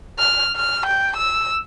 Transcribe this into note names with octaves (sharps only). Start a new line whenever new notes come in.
F6
F6
G5
E6